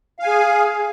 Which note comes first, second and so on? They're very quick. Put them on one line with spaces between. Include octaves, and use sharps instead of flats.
F5 G#5 G#4